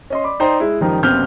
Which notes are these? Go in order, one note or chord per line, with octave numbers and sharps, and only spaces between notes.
C#4 D#5 C6
D5 B5 D6
D#4 C5 D5 G5 A#5 C6
G#3 E4
F#1 D#3 F3 G3 D#4 A#4
F#1 C3 B3 C4 F6 G6